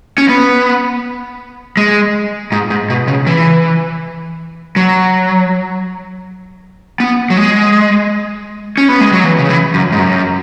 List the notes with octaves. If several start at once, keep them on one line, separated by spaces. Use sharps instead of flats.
C#4
B3
G#3
G#2
G#2
B2
C#3
E3
F#3
B3
F#3
G#3
C#4
B3
G#3
F#3
E3
C#3
E3
F#2
G#2
F#2